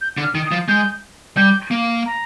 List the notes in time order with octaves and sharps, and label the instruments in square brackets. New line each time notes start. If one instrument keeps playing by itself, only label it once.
[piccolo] G6
[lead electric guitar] D3
[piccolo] F6
[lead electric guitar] D#3
[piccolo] D#6
[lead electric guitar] F3
[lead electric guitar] G#3 [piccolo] G6
[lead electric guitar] G3 [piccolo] G6
[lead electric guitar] A#3
[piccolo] A#5